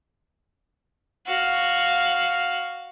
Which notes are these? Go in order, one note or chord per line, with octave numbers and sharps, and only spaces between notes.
F#4 F5